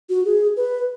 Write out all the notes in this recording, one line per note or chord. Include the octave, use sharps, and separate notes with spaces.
F#4
G#4
B4